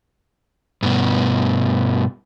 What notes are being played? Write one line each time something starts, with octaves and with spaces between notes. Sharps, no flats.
G2 B2